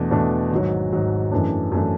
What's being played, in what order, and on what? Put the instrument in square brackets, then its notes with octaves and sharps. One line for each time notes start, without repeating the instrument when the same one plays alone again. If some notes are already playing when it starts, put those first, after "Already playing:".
Already playing: [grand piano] E2 B2 A3 D4
E2 B2 A3 D4
G#1 G#2 F#3
G#1 G#2 F#3
F#2 E3 A3 D4
F#2 E3 A3 D4